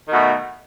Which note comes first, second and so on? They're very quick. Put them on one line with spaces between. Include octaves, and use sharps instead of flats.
D#3 B2 A3